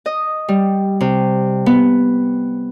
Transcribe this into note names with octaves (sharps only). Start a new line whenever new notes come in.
D#5
G3
C3
B3